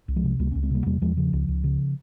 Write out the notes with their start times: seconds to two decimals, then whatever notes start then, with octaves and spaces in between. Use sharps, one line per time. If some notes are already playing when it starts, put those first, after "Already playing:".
0.08 C2
0.16 F3 G#3
0.24 C3
0.39 C#2 G3 A#3
0.51 A#3 C#4
0.55 C#2
0.63 G#3 C4
0.71 C3 G3 A#3
0.86 E2 G3 A#3
1.02 E2 F3 G#3
1.17 C#3 F3
1.33 C#2
1.48 C#2
1.64 C#3